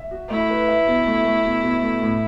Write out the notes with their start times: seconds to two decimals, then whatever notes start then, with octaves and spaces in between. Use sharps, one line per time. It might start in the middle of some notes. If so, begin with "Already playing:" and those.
Already playing: E5
0.11 F#4
0.30 A3 E4
0.49 B4
0.68 E5
0.87 B2
1.07 A3
1.25 A3
1.44 B2
1.63 B2
1.82 A3
2.02 A2